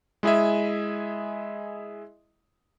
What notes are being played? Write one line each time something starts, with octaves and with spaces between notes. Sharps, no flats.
G#3 E4 G#4 D#5 E5